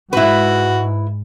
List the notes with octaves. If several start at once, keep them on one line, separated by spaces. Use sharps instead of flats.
G#2 E4 F#4 B4